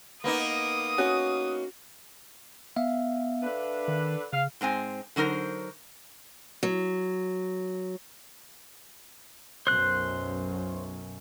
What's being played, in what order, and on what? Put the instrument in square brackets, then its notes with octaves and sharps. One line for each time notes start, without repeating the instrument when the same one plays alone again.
[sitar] A#3 B3 D#4 [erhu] D#6
[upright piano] C#4 F#4
[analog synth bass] B3 [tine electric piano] E5 F5
[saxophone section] D3 D4 B4
[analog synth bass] D#3
[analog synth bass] C#3 [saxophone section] F5
[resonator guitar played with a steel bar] G#2 G#3 C4 G#5
D3 F#3 D#4 A#4 C5
[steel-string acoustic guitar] F#3
[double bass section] B1 F#2 [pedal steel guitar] C5 F#6